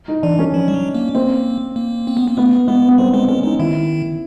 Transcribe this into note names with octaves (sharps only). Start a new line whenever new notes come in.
D#4
E3 D4
C#4
F3
G3
F#3
A#3
A#3 C4
A#3
C4
B3
A#3
A3 B3
G#3 B3
B3
G3 C4
G#3 C4
G#3 C#4
G#3 D#4
D#3 E4